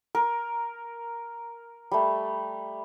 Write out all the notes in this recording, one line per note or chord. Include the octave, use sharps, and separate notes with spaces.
A#4
G3 A3